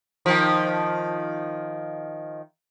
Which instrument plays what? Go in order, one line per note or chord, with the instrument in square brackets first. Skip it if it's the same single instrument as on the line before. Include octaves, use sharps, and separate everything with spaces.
[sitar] D#3 F3